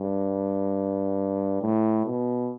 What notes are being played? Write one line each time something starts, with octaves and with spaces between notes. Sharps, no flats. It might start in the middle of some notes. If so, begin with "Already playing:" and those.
Already playing: G2
A2
B2